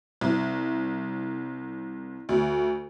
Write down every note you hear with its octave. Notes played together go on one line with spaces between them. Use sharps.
C2
D2